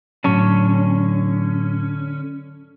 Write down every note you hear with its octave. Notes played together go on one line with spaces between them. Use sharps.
A2 D3 F#3 C#4 A5 C#6